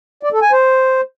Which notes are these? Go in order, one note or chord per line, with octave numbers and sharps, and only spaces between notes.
D5
A4
G#5
C5